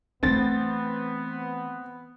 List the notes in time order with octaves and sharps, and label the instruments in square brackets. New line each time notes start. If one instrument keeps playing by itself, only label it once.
[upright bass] E3 A3 [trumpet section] B3 [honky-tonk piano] C4 A6